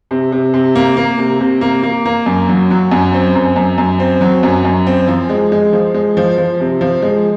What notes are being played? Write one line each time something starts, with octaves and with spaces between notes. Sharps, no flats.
C3
C3
C3
A#3
A#3
C3
C3
A#3
A#3
A#3
F#2
F#3
F#3
F#2
C4
F#2
F#2
F#2
C4
F#3
F#2
F#2
C4
F3
G#3
G#3
F3
G#3
F3
F3
C3
F3
G#3